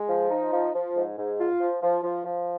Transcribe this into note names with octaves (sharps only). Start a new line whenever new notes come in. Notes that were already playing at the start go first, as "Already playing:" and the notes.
Already playing: G#3
F3
D#4
F3
F3
G#2
G#2
F4
F3
F3
F3
F3